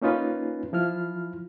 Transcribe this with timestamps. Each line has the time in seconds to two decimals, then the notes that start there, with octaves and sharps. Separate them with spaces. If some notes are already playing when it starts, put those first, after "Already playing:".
0.02 A#3 C#4 D#4 F4 B4
0.73 F3 E4 F4 F6